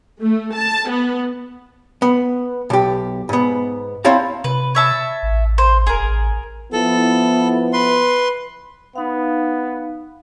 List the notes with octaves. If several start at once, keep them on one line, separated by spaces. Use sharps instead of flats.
A3
A5
B3
B3
B1 G4
G#2 B3
C4 E4 C#5 F5 A5 A#5
C3 B4
C#5 E5 A5
A1
C5
E1 G#4 A#4
A1
F3 B3 E4 A4
B4 C6
B3 D#4 F5